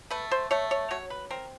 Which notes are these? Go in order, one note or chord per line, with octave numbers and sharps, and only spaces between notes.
A3 B4
C5
A3 C#5
C#5
F#3 C#5
B4
C4 A#4